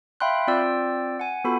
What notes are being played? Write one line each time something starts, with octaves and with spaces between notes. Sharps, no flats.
E5 F5 G5 B5 C6 F#6
C4 F4 D5 G5 E6
F#5 G#5
B3 F4 F#4 A4 B5